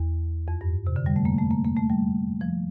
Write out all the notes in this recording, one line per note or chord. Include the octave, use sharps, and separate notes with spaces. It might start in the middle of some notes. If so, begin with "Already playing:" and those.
Already playing: E2
F2
G2
C3
D3
G3
A3
A#3
A3
A#3
A#3
A3
G3
F3